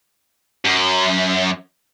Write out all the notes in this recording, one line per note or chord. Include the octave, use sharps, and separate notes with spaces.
F#2